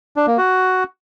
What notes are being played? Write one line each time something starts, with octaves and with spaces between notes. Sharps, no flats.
D4
A#3
F#4